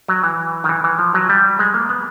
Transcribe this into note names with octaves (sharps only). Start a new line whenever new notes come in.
F#3
E3
D#3
E3
E3
F3
F#3
G3
G#3
A#3
B3